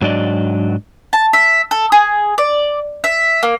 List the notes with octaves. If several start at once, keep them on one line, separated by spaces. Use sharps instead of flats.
G#2 F#3 D4 D5 D#5
A5
E5
A4
G#4
D5
E5
A#3